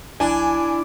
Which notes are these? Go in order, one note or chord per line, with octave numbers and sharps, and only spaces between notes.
A#1 D4 E4 G#5